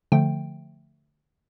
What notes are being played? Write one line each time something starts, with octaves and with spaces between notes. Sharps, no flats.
D3 F3 A3 G5